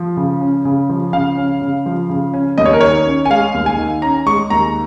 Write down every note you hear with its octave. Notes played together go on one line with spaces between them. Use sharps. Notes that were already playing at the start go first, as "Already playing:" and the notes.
Already playing: F3
C#3
C#4
C#3
F3
C#3 F5
C#4
C#3
F3
C#3
C#4
D#2 D#5
C#5
A#4
D#3 C#5
C#4
G#5
G#3 F5
D#2
G#5
D#3
C#4 A#5
G#3 C#6
D#2 A#5